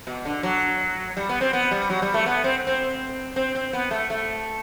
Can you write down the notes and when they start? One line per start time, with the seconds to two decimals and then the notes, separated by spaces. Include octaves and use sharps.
0.07 B2
0.25 D3
0.43 F#3
1.17 G3
1.29 B3
1.41 C4
1.53 B3
1.71 G3
1.90 F#3
2.02 G3
2.14 A3
2.26 B3
2.44 C4
2.67 C4
3.36 C4
3.55 C4
3.73 B3
3.91 A3
4.10 A3